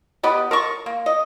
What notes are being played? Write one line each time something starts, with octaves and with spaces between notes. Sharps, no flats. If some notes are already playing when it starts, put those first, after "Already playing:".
B3 G4 B4 D#5
A#4 A5 C#6
A#3
D#5